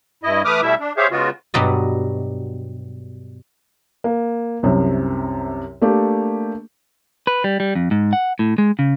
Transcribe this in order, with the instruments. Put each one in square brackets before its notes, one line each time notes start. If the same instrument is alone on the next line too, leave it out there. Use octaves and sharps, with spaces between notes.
[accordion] G2 E4 D#5
E3 A3 B4 D6 D#6 F6
B2 G3 A3 E4 E5
D4
G4 G#4 C5 C#5 E5 F5
C#3 G#3 B3 F4 F#4
[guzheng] G2 B2 F#3 G3 D5 D#5
[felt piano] A#3
C2 F#2 C3
A3 A#3 D4 G4
[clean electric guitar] B4
G3
G3
F2
G#2
F#5
A2
G#3
C#3